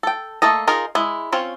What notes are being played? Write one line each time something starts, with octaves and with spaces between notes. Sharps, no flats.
A4 G5
A3 A#3 A4 D#5
D#4 F4 G#4 A#4
G#3 E4
C4 C#4 F4 C#5